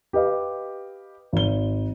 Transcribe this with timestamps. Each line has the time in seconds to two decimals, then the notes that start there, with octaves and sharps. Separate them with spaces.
0.13 G4 B4 D#5 F5
1.33 G#1 G7